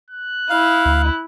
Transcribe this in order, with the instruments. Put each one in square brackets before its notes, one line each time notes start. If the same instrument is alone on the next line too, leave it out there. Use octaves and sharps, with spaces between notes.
[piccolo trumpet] F#6
[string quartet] E4 [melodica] F5
[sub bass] D2